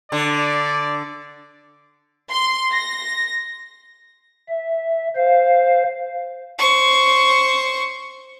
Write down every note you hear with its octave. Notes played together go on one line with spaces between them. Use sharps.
D3 D5
C6
A#6
E5
C5 F5
C5 C#6